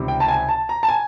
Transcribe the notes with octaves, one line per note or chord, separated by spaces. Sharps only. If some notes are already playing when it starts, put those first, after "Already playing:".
Already playing: C#2 C3 D#3 G3 C4
G5
A5
G#5
A5
A#5
A5
G#5